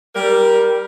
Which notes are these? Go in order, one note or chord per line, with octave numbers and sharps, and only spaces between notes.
G3 A#4